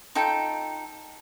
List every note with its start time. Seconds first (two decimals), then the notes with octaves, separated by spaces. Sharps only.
0.15 D#4 F4 A4 G5